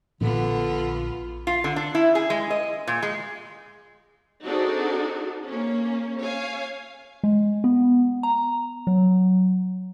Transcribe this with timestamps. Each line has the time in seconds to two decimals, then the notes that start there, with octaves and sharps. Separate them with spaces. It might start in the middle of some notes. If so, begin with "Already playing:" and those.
0.21 A#1 D3 B3 F4
1.47 F4
1.64 D3
1.76 D4
1.95 E4
2.15 G#4
2.30 G#3
2.50 D#5
2.87 A#2
3.03 G#3
4.44 C4 D4 D#4 F#4 G#4 A4
5.49 A#3 C#4
6.22 C#5 F5 G#5
7.24 G#3
7.64 B3
8.23 A#5
8.87 F#3